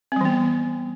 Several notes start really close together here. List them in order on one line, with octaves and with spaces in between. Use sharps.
C4 G3 E3 B3